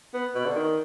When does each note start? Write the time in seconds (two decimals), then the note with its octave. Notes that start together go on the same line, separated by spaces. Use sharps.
0.14 B3
0.35 B2
0.45 D3
0.55 D#3